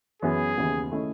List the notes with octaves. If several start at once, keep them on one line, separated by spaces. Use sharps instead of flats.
F#2 E3 B3 G#4
D#2 C#3 E3 B3
D#3 A3 C#4 E4